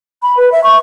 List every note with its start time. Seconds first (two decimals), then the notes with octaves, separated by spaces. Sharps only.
0.23 B5
0.37 B4
0.52 E5
0.64 C#6